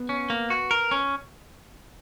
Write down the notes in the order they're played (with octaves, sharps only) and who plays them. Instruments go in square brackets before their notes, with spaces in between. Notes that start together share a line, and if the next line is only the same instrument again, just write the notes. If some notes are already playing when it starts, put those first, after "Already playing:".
Already playing: [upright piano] B3
[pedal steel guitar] C#4
A#3
F#4
A#4
C#4